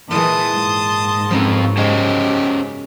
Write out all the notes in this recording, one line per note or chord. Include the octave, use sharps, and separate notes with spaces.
A#2 E3 G#3 A5 C6 D#6
G#2
F#2 F3 B3 C4
C#3 C#4 G4 C5 D#5